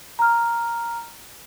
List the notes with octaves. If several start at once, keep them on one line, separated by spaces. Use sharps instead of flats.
A#5 F6